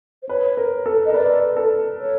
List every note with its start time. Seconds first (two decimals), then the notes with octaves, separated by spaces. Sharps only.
0.23 C5
0.29 B4 C#5
0.57 A#4
0.86 A4
1.06 A#4 D#5
1.14 B4 D5
1.57 A4
1.99 C#5